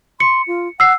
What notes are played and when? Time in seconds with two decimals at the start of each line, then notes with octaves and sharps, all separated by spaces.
0.20 C6 C#7
0.48 F4
0.80 F#5 E6 C7